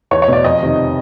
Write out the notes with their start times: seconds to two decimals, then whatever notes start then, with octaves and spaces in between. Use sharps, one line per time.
0.11 E2 C#5
0.22 C#5
0.28 B2 D5
0.44 F2 D#5
0.61 C3 D#3